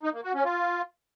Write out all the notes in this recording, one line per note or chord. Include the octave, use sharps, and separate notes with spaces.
D#4
A#3
F#4
C#4
F4